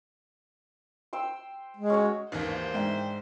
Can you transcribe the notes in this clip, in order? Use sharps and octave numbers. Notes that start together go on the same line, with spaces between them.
C5 G5 E6
G#3
C#4 F#4 C#5
G#1 D#2 D#3 E3 C5
G#2 D4 E4 G5